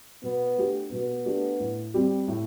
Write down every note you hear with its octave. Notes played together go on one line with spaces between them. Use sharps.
B2 B3
A3 D4 G4
B2 B3
A3 D4 G4
A2
G3 C4 G4
A2